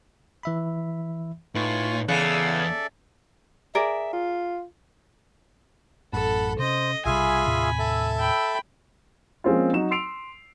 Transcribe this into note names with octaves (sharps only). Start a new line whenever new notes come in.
E3 E5 B5
A2 D#4 F4 B4 G#5 C#6
E2 C#3 A4 D5 E5 F#6 C#7
G#4 A#4 D5 E5
F4
A1 F#2 A2 A4 F#5 A5 B5
C3 C#4 C5 D#5
B1 C3 G3 F4 G#4 E5 G#5 B5
D#2 A2 C3
A4 E5 A5
G5 B5
F3 G#3 A#3 C4 C#4 F4
F#3 D#4 F#4 E7
C6 E6 C7 D7 F7